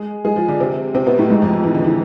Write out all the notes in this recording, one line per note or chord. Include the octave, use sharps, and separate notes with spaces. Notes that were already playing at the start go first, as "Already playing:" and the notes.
Already playing: G#3 G#4
G#3 G#4
F3 F4
D3 D4
C3 C4
C3 C4
B2 B3
A2 A3
G#2 G#3
F2 F3
F3
E3
D3
E3